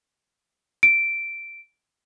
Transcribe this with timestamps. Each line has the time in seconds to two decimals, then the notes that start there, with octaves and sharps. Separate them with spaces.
0.83 D7